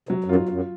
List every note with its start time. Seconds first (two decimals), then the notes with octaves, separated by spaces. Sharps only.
0.09 C3 F#3
0.24 F#2 F4
0.36 G#2
0.48 F#2 F4